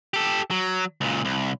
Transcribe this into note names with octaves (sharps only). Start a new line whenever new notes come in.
G4 A4
F#3
C#2 A#2
C2